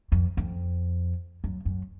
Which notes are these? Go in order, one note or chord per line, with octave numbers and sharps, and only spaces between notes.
F2
F2
F#2
F#2